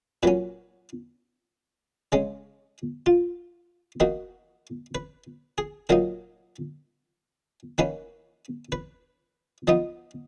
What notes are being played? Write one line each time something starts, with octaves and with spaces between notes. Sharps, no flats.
A#2 F#3 C#4 B4
C#3 G#3 C#4
F4
D#3 A#3 D#4 F#4
B4
G#4
A#2 F#3 A#3 D#4 A#4
D#3 A#3 C#4 B4
B4
F3 B3 D#4 D#5